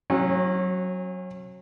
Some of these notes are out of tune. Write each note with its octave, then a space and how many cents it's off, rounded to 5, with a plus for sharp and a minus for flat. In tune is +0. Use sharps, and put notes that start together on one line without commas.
F#3 +0 C#4 -35